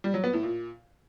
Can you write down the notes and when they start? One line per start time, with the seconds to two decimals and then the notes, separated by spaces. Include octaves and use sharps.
0.04 G3
0.14 F#3
0.24 B3
0.33 A2
0.43 A#2